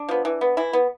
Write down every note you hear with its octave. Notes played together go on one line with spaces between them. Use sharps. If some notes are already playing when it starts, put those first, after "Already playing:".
Already playing: D4
F3 B3
E3
B3
E3 E4
B3